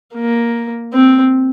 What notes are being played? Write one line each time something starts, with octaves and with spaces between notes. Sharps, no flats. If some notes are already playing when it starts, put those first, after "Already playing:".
A#3
C4